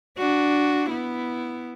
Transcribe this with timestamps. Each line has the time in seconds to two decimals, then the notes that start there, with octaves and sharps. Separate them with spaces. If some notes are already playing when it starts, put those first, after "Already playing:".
0.18 D4 F#4
0.90 B3 E4